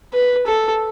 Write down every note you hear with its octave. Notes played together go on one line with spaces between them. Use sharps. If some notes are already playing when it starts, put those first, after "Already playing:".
B4
A4